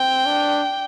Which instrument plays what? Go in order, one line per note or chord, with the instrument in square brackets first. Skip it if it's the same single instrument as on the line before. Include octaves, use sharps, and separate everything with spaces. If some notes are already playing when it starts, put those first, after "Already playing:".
Already playing: [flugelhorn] C4 [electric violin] G5
[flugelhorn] D4